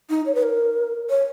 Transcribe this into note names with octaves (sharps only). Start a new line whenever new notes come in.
D#4
C#5
B4
A#4
C#5